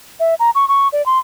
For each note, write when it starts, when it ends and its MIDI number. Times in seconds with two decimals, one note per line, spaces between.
0.20 0.35 76
0.40 0.50 82
0.55 0.68 85
0.68 0.88 85
0.93 1.04 74
1.06 1.19 84